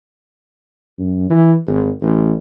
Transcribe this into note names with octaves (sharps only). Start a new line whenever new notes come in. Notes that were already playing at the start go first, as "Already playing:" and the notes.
F#2
E3
G#1
A1